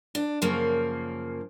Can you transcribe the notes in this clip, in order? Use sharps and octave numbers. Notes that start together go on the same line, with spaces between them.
D4
F#2 C#3 F3 A#3